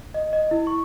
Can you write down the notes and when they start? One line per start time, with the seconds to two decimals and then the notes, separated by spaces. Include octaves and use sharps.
0.14 D#5
0.33 D#5
0.51 E4
0.67 C#6